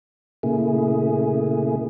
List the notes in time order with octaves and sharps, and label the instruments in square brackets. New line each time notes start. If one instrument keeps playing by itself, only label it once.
[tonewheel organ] A#2 C#3 A3 A#3 E4 G#4